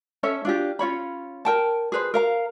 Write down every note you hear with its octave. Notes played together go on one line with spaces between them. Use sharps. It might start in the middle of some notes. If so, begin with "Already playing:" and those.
C#4 A4 C#5 E5
D4 F4 G4
C#4 F4 C#5 B5
A#4 G5 A5
G#4 B4 C5
A#4 F5 A#5